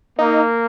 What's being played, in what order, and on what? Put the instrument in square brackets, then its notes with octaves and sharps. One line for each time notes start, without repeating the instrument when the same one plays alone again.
[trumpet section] A#3 [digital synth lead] D#4